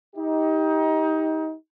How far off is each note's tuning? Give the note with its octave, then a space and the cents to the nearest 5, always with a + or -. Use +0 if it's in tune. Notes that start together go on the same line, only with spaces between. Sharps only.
D#4 +25 G4 +5